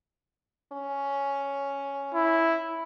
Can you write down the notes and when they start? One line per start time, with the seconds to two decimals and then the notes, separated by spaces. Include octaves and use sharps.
0.72 C#4
2.15 E4